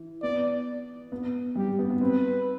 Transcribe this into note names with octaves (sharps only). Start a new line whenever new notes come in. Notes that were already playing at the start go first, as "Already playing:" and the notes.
Already playing: E3
B3 D5
B3
G3 G4
B3
B3
C4 B4